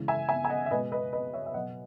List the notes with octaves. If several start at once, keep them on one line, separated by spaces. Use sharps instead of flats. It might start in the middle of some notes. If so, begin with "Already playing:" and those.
Already playing: C#3 E3 G#3
E5 G#5
E5 G#5
G#5
D#5 F#5
E5
B2 G#3 B4 D#5
B4 D#5
B4 D#5
C#5 E5
E5
B2 F#3 D#5 F#5